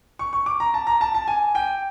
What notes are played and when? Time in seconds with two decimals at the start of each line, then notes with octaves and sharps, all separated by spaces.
0.19 C#6
0.33 C#6
0.46 D6
0.60 A#5
0.74 A5
0.87 A#5
1.01 A5
1.14 A5
1.28 G#5
1.55 G5